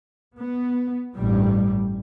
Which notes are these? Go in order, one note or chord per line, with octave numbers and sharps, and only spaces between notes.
B3
A1 G2 G3